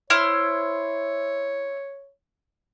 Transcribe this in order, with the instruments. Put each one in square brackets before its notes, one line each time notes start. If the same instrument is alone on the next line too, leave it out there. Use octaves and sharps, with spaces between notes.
[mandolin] E4 C5 F6 [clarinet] C#5